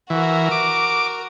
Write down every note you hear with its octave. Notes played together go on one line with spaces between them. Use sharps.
E3 F#4 A#4
D6